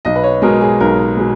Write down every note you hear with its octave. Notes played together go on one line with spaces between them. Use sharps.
B1 D#5
B4
C#5
B2 G#3 A#4
G#4
B1 A#4
B2 G#3